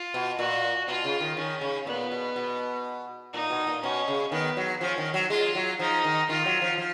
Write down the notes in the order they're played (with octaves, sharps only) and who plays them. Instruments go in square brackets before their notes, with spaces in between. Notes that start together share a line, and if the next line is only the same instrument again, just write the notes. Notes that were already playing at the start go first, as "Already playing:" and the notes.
Already playing: [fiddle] F4
[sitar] B2
[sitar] A#2 [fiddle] F#4
[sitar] B2 [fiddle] F4
[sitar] C#3
D#3
[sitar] D#3 [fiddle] C#4
[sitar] C#3
[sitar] A#2 [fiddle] B3
[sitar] B2
B2
[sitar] A#2 [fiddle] D#4
[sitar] B2
A#2
[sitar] B2 [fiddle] C#4
[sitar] C#3
[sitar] D#3 [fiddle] B3
[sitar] F#3
[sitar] F3 [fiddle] C#4
[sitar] D#3
F#3
[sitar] G#3 [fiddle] F4
[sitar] F#3
[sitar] F3 [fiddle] D#4
[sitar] D#3
[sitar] D#3 [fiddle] F4
[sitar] F#3
F3
F3